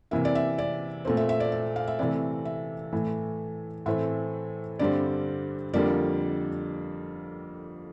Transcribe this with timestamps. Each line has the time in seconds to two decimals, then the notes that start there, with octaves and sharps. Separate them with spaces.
0.11 C3 E3 A#3 E5
0.25 D5
0.35 E5
0.58 D5
1.05 A#2 A3 C4
1.17 E5
1.29 E5
1.40 D5
1.52 E5
1.76 F5
1.87 E5
1.99 C3 E3 A3 D5
2.45 E5
2.93 A2 E3 A3
3.86 A2 E3 A3 C4 E5
4.79 G2 D3 G3 C4 D5
5.73 F2 D3 G3 A#3 D5